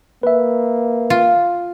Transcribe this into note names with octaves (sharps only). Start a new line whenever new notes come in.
A#3 B4 E5
F4